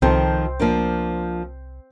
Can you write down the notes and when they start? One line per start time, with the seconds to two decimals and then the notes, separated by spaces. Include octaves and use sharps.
0.02 C2 D#3 F3 C4 A4
0.60 F3 A#3 D4